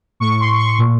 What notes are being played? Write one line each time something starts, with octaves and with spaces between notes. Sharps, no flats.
A2 C#6
C6
C#6
A#2